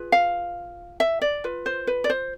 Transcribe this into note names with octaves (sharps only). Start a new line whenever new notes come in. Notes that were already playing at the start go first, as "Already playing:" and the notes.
Already playing: F4 G#4 B4
F5
E5
D5
F4 B4
C5
B4
D5
C5